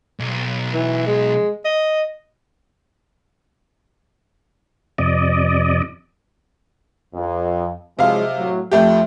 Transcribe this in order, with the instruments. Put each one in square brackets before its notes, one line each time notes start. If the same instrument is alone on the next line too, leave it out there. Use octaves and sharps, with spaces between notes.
[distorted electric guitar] B1
[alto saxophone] E3
G#3
D#5
[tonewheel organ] F2 C3 D5 D#5
[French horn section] F2
[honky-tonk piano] C3 F5 [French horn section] F3 F#3 G#3
[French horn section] A2 F#3
[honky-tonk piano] F2 A3 G4 [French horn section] F3